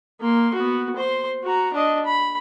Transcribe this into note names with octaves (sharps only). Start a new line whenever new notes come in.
A#3 C6
B3 F#4
C5 C6
F#4 A#5
D4 D#5
B5